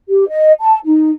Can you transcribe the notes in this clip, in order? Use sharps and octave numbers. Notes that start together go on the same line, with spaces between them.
G4
D#5
A5
D#4